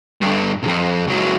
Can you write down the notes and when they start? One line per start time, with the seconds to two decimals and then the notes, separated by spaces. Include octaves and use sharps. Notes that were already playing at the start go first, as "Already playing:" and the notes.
0.22 G2 D3
0.63 C2 F2
1.07 C#2 F#3